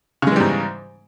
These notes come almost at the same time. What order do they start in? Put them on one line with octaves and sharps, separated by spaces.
C#3 G#3 E3 G3 G#2